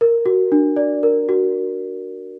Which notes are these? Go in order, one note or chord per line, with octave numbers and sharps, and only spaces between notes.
A#4
F#4
D4
D5
A#4
F#4